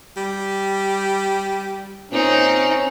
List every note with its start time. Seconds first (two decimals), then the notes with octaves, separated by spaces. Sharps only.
0.17 G3
2.12 A#2 C4 C#4 D#4